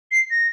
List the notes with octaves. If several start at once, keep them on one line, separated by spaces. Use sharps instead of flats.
C7
A#6